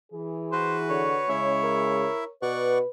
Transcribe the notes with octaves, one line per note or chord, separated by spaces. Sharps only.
E3 G#4
F#4 B4 C5
D3 C#5
C#3 G#3 C#4 E4 E5
A#4
B2 B4 D5 F#5 C#6